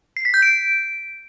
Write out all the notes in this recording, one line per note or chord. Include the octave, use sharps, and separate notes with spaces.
C7
B6
G6
D7